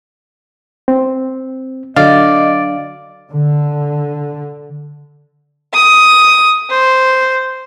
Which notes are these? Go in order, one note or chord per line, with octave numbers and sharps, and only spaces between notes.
C4
D3 F#3 D5 D#5 F5
D3
D#6
C5